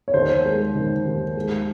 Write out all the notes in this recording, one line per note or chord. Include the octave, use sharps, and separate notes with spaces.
C#5
D#2 C5
G#3
D#3
D#2
G#3